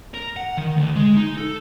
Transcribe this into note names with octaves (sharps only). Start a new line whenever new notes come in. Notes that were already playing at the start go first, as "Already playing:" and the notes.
A#4
F#5
D#3
D2
G#3
D#4
A4